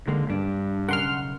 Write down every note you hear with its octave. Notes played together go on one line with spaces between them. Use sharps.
D3 D#3 G#3 A#3
G2 D4
B1 C#3 A#4 F#5 C6 F6